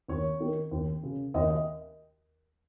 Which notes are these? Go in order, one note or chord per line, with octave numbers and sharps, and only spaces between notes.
D#2 C#5
D#3
D#2
C#3
D#2 D#5
D#5